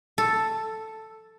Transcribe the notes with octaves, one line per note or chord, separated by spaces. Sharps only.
A4